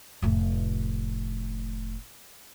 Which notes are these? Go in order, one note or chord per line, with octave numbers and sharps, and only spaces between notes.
F1 A2